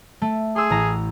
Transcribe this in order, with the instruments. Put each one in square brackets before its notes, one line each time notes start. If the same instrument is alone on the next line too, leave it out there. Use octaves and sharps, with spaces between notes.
[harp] A3
[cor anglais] G#4 [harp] C6 E6
[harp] A1 A#5